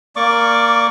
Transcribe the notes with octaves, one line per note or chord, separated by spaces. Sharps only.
A#3 D5 C#6 D6